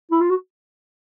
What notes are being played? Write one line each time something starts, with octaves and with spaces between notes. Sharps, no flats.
E4
F4
F#4